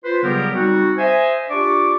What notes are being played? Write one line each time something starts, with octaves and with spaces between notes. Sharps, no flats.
F4 B4 C5
C#3 F#3 G3 B3 G4 A#4
G3 C4 D#4 F#4
C5 D#5 E5 G#5
D4 F4 G4 D5 C#6 D6